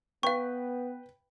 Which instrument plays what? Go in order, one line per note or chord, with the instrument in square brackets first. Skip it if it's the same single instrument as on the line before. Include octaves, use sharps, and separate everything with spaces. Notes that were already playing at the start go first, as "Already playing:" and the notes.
[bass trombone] B3 [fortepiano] B4 G5 [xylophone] F5 C#6